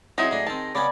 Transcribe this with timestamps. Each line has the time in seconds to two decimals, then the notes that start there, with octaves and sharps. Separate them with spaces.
0.18 F#3 C4 C#4 D#4 E4 G#4 D#5
0.31 A2 D4
0.47 D#3 C4 A5
0.75 C#3 B3 C#4 D5 G#5 B5